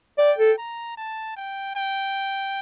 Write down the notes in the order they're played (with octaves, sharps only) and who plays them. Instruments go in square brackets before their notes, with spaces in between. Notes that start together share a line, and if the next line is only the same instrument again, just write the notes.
[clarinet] D5 [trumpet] G5
[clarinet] A4
[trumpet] A#5
A5
G5
G5